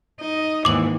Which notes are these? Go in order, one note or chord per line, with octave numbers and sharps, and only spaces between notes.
D#4 D#5
D#2 G#2 E3 D6 F#7